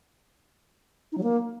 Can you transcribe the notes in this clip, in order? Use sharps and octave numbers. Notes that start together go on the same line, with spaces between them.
D#4
F#3
A#3